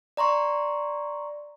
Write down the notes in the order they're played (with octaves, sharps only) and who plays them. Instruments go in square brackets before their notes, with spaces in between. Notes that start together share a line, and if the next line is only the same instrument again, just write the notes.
[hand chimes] D5 A#5 C6 C#6